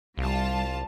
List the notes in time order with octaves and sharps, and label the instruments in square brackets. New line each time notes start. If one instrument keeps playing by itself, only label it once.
[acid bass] C2 [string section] G3 F4 A5